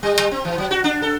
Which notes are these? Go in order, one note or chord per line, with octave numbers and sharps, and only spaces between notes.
G3
G3
C4
E3
F#3
F#4
D4
A4